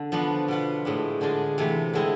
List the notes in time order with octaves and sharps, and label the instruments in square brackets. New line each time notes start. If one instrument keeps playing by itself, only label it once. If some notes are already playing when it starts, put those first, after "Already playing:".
Already playing: [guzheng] D3
F3 B3 D4 F4
B2 B3 F4
A2 G#3 D4
D3 G#3 D4 F4
C3 E3 A3
D3 G#3 C4 E4